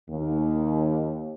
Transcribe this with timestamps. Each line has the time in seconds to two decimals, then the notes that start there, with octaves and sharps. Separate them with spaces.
0.10 D#2